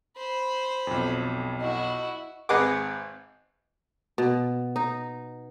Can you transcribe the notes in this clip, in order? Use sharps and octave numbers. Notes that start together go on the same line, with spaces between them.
C5 B5
B1 F2
E4 F#4 D#5
G#1 G#4 B4 D#5 F#5 D6
B2
D#4